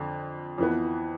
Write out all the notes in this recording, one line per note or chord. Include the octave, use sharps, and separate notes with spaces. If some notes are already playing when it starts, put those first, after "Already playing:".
Already playing: F2 D3
F2 E3 B3